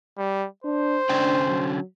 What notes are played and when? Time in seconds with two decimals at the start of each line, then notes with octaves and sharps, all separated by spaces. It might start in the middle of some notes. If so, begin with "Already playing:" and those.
0.18 G3
0.64 D4 C5
1.09 D3 C#4 D4 G5
1.47 F#3